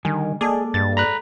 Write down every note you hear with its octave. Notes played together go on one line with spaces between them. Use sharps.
D3 D#3 G3 G#5
G#3 A#3 G#4 A4 D5
G2 A6
A#5 B5 F#6